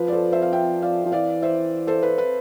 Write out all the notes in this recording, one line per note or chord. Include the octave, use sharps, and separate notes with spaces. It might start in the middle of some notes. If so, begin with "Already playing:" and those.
Already playing: F3 B4
D5
A4 C5
C5 E5
F5
E5 G5
D5 F5
F3
E3 D5 F5
C5 E5
A4 C5
B4
B4